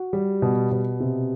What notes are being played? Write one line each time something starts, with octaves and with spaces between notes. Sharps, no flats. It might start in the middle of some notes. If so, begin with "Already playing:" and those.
Already playing: F#4
G3
B2
B2
C3